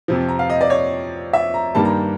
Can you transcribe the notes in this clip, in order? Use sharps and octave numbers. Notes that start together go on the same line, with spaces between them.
F2 C3 F3
A#5
F5
D#5
D5
C#5
E5
A#5
G2 D#3 G3 A#3 A5
A#5